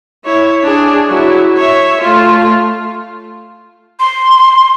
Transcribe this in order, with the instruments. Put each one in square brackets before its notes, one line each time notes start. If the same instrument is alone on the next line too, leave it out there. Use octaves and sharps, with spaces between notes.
[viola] E4 C#5
D4 G#4
F#3 E4
C#5 E5
A3 F4
[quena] C6